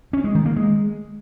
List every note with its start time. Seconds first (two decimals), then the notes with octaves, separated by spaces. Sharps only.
0.13 C#4
0.24 G#3
0.35 D#3
0.46 A#3
0.56 G#3